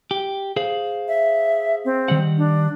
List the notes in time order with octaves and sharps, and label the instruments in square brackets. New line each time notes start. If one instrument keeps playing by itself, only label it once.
[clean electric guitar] G4
G#4 C5 F5
[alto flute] E5
C4
[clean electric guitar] D#3 G3 F#5
[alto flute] D4